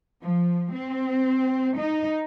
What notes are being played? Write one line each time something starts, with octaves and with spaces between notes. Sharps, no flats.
F3
C4
D#4